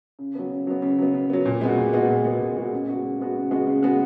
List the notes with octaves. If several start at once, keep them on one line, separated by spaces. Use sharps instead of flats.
C#3
F#3 B3
C#3
F#3 B3
C#3
F#3 B3
C#3
F#3 B3
A#2
G#3 B3 F#4
A#2
G#3 B3 F#4
A#2
G#3 B3 F#4
A#2
G#3 B3 F#4
C#3
G#3 B3 F#4
C#3
G#3 B3 F#4
C#3
G#3 B3 F#4
C#3
G#3 B3 F#4